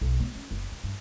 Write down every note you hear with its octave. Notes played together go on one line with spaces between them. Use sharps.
B1
B3
C#4
F#1
C#3
G2